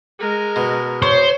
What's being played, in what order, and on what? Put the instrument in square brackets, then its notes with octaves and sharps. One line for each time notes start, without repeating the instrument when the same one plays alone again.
[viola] G#3 A#4
[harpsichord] B2
[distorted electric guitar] C5 [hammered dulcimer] C#5